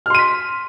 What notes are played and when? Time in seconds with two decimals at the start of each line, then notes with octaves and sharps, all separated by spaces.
0.06 F6
0.10 C6
0.15 D#7
0.19 B6